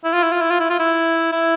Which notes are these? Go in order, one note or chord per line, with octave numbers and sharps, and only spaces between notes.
E4
F4
E4
F4
E4
F4
E4
F4
E4
E4